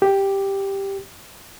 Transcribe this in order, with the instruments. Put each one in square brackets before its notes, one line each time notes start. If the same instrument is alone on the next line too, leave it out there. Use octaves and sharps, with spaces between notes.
[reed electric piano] G4